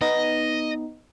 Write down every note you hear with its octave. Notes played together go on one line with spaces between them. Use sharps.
B3 D#4 D#5